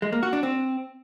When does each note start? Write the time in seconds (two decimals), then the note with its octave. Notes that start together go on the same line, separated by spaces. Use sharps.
0.02 G#3
0.12 A#3
0.23 F#4
0.33 D4
0.43 C4